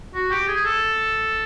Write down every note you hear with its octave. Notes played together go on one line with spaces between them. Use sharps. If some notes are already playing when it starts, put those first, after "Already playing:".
F#4
G4
G#4
A4